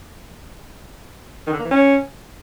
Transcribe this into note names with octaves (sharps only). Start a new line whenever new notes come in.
D#3
D3
A#3
E3
C#4